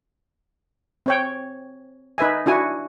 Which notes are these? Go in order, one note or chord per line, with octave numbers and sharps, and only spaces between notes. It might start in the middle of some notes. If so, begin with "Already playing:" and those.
C4 C#5 G5
D#4 B4 E5 G#5
D4 E4 F#4 G#5